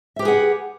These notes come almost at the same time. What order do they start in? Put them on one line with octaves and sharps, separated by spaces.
E5 G4 B4 G#4 F#5